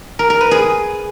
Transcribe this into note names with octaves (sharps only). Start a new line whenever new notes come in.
A#4
A#4
B4
G#4